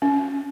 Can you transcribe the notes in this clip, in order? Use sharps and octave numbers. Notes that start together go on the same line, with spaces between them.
C#4